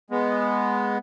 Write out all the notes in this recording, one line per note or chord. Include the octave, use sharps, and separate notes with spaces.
G#3 B3